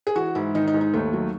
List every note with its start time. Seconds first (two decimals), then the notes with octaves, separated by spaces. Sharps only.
0.07 G#4
0.16 E3 F#4
0.35 G#2 E4
0.54 D#3 D#4
0.67 D#4
0.74 G#2
0.81 D#4
0.94 D#2 A3
1.13 F#3